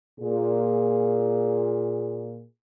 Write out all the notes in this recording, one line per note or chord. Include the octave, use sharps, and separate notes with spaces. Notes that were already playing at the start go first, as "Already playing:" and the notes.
A#2 G#4